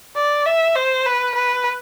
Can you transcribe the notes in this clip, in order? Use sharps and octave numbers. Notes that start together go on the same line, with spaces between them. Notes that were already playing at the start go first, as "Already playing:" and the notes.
D5
E5
C5
B4
B4